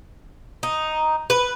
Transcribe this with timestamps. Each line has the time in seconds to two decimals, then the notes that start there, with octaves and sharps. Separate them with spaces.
0.63 D#4
1.30 B4